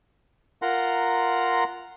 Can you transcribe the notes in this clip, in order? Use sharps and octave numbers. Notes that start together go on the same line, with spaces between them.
F4 A#4 F#5 A#5 C6